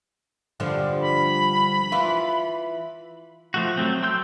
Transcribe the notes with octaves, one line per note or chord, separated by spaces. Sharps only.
G2 D3 F3
B5
E3 F4
F3 A3 F#4
F#3 A3 C4
G5 C6 E6 G6